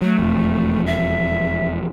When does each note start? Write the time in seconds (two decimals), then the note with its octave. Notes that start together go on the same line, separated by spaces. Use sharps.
0.02 F#3 A3
0.19 E1 F2
0.86 E5